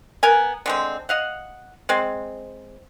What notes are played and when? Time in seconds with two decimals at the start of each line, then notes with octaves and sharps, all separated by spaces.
0.23 B3 A#4 G#5
0.66 D3 G#3 C4
1.09 D#5 F5 F#5
1.89 G#3 C4